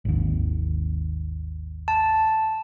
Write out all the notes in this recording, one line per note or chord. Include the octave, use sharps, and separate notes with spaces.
G#1 D#2
A5